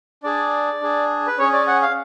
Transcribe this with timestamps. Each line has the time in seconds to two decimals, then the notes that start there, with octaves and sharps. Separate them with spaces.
0.23 D4 G#4 D5
0.81 D4 G#4
1.27 B4
1.38 C#4 G#4 C#5
1.53 D5
1.67 F#5
1.82 F5